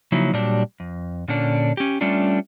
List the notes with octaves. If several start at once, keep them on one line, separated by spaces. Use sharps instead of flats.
C#3 F3 F#3 A#3 D#4 E4
A#2 F#3 G3 D4 G4
F2
A#2 D3 C#4 D4
C#4 G4
G3 A3 C#4 D4 F4